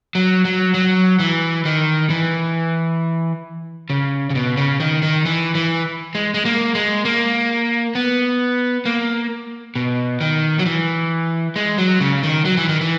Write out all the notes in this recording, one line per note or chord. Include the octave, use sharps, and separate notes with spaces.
F#3
F#3
F#3
E3
D#3
E3
C#3
C#3
B2
C#3
D#3
D#3
E3
E3
G#3
G#3
A#3
G#3
A#3
B3
A#3
B2
D#3
F#3
E3
G#3
F#3
C#3
D#3
F#3
E3
D#3
E3